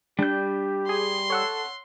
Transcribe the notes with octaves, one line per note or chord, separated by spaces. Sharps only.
G3 D4 G4 G6
G#4 C6
A4 C#5 F#5 E6